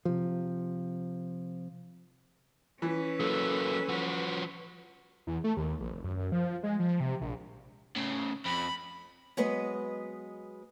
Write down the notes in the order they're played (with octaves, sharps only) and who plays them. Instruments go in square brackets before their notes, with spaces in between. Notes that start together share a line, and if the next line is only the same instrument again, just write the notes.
[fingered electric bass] C3 F3
[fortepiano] E3 [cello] C#4 B4
[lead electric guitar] F#3 A#3 [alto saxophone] A4
[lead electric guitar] F3 F#4
[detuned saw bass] E2
A3
D#2
A#1
F1
F#2
F3
G#3
F3
C3
A#1
[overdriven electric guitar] A2 C#3
[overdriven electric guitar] F2 [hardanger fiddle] B5
[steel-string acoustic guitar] F#3 G#3 B3 B4 D#5